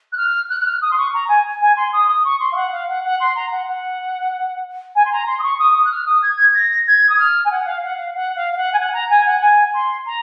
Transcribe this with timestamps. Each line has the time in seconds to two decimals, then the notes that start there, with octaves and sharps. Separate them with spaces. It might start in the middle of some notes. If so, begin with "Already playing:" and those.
0.12 F#6
0.17 F6
0.49 F#6
0.61 F#6
0.65 F6
0.81 D#6
0.91 C6
0.98 C#6
1.14 A#5
1.28 G#5
1.61 G#5
1.77 C6
1.93 D#6
2.09 D#6
2.24 C#6
2.40 C6
2.52 F5
2.56 F#5
2.72 F5
2.89 F#5
3.04 F#5
3.20 C6
3.36 A#5
3.51 F#5
3.68 F#5
4.95 G#5
5.05 C6
5.12 A#5
5.27 C6
5.39 D#6
5.43 C#6
5.59 D#6
5.75 D#6
5.85 F#6
5.91 F6
6.06 D#6
6.22 G#6
6.55 A#6
6.87 G#6
7.09 D#6
7.19 F6
7.45 G#5
7.51 F#5
7.66 F5
7.83 F#5
7.98 F5
8.14 F#5
8.36 F5
8.52 F5
8.57 F#5
8.73 G#5
8.78 F#5
8.93 A#5
9.10 G#5
9.26 F#5
9.41 G#5
9.74 C6
10.06 A#5